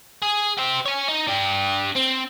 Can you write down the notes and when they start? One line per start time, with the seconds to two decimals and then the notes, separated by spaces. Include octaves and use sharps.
0.22 G#4
0.57 G4 C5
0.86 C#5 G#5
1.09 D#4
1.28 D4 G4
1.95 C4